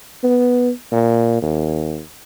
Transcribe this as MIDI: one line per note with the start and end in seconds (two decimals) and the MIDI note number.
0.23 0.70 59
0.92 1.39 46
1.42 2.00 39